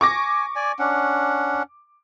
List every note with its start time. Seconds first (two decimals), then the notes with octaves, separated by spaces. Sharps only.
0.01 G#5 C#6 D6 A#6
0.56 D5 G#5
0.79 C#4 D4 F#5